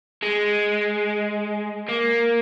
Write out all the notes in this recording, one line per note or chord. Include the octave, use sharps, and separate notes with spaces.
G#3
A#3